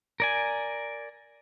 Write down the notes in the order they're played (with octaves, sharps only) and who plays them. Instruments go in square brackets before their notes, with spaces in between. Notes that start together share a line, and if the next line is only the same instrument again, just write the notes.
[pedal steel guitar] A#4 D5 G#5